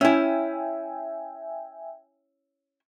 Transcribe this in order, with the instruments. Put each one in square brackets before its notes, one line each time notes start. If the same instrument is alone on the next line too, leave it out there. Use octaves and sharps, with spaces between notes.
[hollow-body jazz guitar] C#4 E4 [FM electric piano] E5 G5 G#5